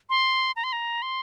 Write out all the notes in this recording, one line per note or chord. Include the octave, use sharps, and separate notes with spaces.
C6
A#5
C6
A#5
C6